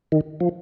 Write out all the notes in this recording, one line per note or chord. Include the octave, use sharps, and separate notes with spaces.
D#3
F3